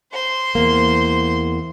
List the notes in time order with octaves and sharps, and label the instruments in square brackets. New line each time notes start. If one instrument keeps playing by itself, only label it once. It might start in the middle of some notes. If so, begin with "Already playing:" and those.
[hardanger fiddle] C5 C6
[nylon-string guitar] E2 A#3